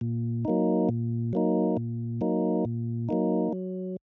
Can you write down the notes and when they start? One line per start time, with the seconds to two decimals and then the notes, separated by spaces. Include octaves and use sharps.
0.01 A#2
0.45 F#3 A#3 D#4
0.89 A#2
1.33 F#3 A#3 D#4
1.77 A#2
2.21 F#3 A#3 D#4
2.65 A#2
3.09 F#3 A#3 D#4
3.53 F#3